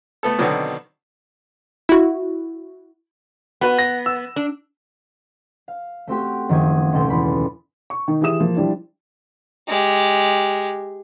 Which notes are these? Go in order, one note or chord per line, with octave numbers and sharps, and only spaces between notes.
A3 B3 A4
B2 D3 D#3 F#3 B3 C4
E4 F#4
B3 F#4 B4
A#6
E6
D4
F5
A3 C4 F#4 G4
F#1 D#3 F3 F#3 D#6 G#6
C#2 B2 A4 G5 C6
E2 B5
C#6
D#3 D#4
E3 G4 G#4 E5 D#6 E7
F3 A#3
F3 G3 D4 E4
G#3 G4